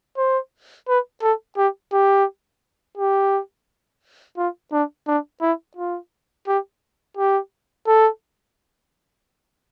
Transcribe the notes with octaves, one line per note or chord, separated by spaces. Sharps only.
C5
B4
A4
G4
G4
G4
F4
D4
D4
E4
F4
G4
G4
A4